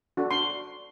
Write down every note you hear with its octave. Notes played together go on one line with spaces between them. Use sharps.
D4 F#4 A4
C6